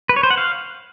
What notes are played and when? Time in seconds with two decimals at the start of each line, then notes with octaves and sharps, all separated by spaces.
0.09 B4
0.16 C#5
0.23 C5
0.30 F#5
0.37 F5